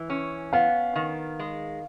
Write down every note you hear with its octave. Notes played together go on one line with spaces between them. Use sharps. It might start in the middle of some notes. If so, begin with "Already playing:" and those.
Already playing: E3
C#4
B3 F5
D#3
G#3